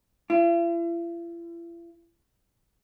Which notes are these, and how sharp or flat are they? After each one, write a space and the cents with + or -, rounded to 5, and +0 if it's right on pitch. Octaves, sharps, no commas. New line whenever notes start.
E4 +45